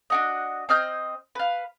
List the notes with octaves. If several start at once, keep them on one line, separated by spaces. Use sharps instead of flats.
D4 F#4 D#5
C4 D#5 F6 G6
B4 F5